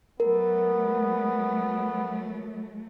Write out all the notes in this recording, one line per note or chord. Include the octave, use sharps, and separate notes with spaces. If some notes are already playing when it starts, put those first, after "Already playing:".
F#3 A3 B3 A#4